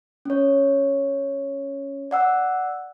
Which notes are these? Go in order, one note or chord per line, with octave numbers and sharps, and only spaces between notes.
C#4 C#5
D5 F#5 E6